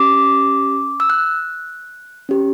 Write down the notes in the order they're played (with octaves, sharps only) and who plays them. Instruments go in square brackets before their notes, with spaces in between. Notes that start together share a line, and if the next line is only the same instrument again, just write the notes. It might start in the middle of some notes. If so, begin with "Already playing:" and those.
Already playing: [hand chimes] C#4 G4 D6
E6
F#6
C#4 G4